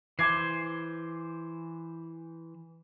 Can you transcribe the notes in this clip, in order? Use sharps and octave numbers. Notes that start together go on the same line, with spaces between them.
E3 C5 D6 G#6 C7